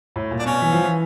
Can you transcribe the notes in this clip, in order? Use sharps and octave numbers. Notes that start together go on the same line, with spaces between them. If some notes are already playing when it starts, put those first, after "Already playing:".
A2
A#2
D4
B2 C#4
E3
F3
E3